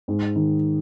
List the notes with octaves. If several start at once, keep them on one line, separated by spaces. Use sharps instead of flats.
G#2
D#3